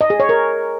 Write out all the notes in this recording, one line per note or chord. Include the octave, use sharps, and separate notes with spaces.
D#5
G#4
C#5
A#4